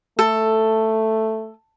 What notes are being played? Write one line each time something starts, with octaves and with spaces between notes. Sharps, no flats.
A3 A4